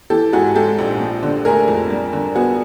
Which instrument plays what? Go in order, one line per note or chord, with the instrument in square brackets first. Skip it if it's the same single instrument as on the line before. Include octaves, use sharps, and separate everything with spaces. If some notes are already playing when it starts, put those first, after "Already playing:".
[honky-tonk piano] E3 G4 A4
G#2 F#4 G#4
G#3 G4 A4
A#1
F3
D3
A3 G#4 A#4
F2
G3
D3
B3 F#4 G#4